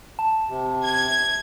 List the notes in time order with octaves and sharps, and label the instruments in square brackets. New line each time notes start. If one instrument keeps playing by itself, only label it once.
[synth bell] A5
[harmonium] C3
[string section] G#6